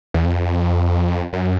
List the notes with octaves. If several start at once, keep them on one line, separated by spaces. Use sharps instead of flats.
E2
F2
F#2